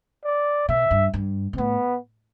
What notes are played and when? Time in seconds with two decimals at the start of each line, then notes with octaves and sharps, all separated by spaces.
0.24 D5
0.68 B2 E5
0.91 G2
1.14 G2
1.53 B2
1.58 A2 B3